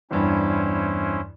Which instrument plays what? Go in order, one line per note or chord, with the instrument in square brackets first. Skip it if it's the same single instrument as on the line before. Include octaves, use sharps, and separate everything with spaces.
[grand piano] E2 G2 [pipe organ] C#4 E4 C5